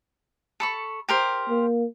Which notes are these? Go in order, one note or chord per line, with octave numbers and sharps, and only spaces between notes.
A4 B5 C#6
G4 A#4 C5
A#3